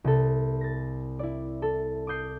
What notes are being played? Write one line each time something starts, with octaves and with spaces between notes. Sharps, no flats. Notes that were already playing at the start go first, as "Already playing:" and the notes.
C2 A4
A6 A#6
E4 D5
A4
D6 D#6 G6 C7